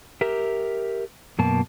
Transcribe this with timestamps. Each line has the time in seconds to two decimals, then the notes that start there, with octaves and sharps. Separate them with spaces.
0.21 G4 A#4 E5
1.39 F#2 B2 A#3 A5